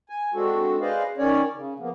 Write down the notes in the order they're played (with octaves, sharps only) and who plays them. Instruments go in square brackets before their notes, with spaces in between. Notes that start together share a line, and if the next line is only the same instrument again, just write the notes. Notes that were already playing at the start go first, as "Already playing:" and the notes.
[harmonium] G#5
G#3 C4 D4 F#4 A4
G#4 B4 C5 D5 D#5 F5
D#3 C#4 C#5 D5
C#3
F3 A#3 B3